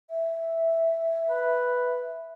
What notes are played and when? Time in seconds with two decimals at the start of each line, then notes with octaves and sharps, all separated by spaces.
0.10 E5
1.28 B4